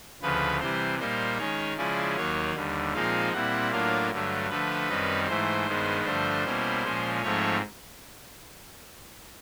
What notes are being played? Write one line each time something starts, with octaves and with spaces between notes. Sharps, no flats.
D2 C#3 F3 B4
C3 E3 G3 C5
A#2 G3 A#3 D#4 C5
D#3 G#3 C#4 C#5
C#3 F3 G#3 C#4 E4 D5
D#2 D#3 F#3 A#3 C#5
D#2 D3 G3
A#2 F3 G#3 C4 D#4 F5
A#2 G3 C4 E4 F#5
A2 F#3 A#3 D4 F4 F5
G2 D3 F#3 A3
D3 F3 A3 B4
F#2 D#3 G3 C4 D#4
G#2 E3 A3 C5
G2 D#3 G#3 B3
G2 D3 F3 A3 D4 C5
B2 G3 A#3 C#4 E4
A#2 F3 G#3 C#4
G#2 F3 A3 C4 C#5